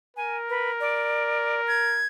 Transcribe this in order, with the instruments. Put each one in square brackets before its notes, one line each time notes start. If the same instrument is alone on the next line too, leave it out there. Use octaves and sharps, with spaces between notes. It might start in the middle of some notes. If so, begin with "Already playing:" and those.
[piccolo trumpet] A#4 [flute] G#5
[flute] B4
D5
G#6